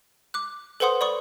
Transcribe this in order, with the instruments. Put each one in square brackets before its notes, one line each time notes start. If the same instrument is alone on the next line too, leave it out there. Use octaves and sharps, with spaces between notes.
[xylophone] D6 F#6
A4 B4 C5 F#5 C6 D#6
D5 B5 C#6 D#6